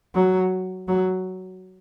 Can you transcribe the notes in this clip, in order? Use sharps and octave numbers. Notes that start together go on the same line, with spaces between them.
F#3
F#3